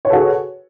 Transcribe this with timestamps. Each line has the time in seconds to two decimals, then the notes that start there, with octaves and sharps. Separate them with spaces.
0.05 C#5
0.08 B4
0.10 A4
0.13 F#4
0.16 G#4